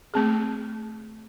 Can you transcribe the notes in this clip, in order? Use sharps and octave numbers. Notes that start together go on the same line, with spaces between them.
A3 C4 G#4